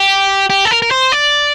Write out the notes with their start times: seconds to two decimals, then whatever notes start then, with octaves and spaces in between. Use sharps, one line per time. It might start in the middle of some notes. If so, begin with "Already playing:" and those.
Already playing: G4
0.50 G4
0.65 A4
0.71 A#4
0.82 A#4
0.91 C5
1.12 D5